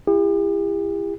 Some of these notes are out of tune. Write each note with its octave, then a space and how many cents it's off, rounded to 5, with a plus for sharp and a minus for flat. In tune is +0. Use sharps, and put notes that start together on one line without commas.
E4 +30 G4 +45